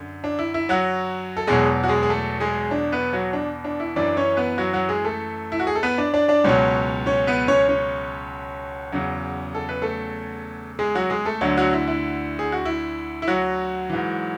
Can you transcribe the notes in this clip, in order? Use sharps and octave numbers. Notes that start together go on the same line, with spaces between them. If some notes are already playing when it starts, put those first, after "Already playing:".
Already playing: F#2 D3
D4
E4
E4
F#3 F#4
A4
E2 B2 F#3 G#3 G#4
F#4
G#3 G#4
G#4
A3 A4
G#3 G#4
D4
B3 B4
F#3 F#4
D4
D4
E4
F#2 E3 D4 D5
C#4 C#5
B3 B4
F#3 F#4
F#3 F#4
G#3 G#4
A3 A4
E4
F#4
G#4
A4
B3 B4
D4 D5
D4 D5
D4 D5
C#2 B2 F#3 C#4 C#5
C#4 C#5
B3 B4
C#4 C#5
C#4 C#5
E2 C#3 F#3
A4
B4
A3 A4
G#3 G#4
F#3 F#4
G#3 G#4
A3 A4
D2 D3 F#3
F#3 F#4
E4
E4
G#4
F#4
E4
E4
F#3 F#4
G#2 E3